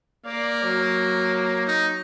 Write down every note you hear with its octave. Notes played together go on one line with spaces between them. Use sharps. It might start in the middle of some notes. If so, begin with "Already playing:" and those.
A#3 D5 F5
F#3
D#4